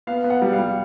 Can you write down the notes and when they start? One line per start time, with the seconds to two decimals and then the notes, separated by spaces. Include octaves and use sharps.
0.07 B3 F5
0.24 B3
0.30 F#5
0.42 G3
0.53 F5
0.59 G3